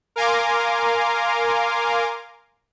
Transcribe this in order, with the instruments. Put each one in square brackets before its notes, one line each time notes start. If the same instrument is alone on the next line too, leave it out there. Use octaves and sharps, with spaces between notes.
[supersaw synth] A#4 F5 G#5 A#5 C6 D6